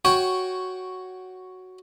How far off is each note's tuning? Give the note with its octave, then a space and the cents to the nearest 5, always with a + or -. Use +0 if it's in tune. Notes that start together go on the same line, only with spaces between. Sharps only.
F#4 +0 C#5 +0 G5 +0